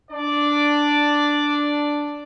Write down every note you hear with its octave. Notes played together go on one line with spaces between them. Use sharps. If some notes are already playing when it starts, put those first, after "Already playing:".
D4 D5